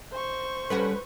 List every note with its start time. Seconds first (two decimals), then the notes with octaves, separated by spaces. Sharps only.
0.12 C5 C#6
0.70 G3 C#4 F#4 A4 B4